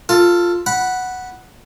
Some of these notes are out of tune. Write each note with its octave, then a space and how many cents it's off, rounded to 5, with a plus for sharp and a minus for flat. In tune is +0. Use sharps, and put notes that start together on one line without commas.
F4 +0 A4 +15
F#5 +0 B5 -10